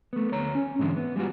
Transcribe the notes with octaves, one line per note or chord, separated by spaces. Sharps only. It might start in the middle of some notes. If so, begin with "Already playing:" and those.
A3 B3
D2 C#5 A#5
C#4
G#2 D3 E3 G#3 C4 D4
B3
G3 G#3 D4 F4 F#4